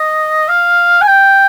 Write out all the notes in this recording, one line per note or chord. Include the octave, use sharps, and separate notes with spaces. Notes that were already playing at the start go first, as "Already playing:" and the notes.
Already playing: D#5
F5
G#5
G5